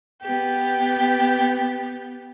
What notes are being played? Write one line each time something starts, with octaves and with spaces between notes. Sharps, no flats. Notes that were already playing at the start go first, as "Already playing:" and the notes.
B3 G4